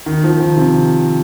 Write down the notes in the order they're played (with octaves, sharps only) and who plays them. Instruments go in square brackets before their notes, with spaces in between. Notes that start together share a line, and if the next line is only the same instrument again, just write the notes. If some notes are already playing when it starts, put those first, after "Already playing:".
[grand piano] D#3
F3
D#3
C3